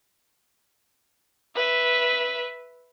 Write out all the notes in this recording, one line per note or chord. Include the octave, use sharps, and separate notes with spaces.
B4 E5